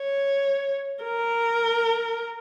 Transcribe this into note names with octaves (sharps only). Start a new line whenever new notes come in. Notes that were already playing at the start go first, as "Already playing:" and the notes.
Already playing: C#5
A#4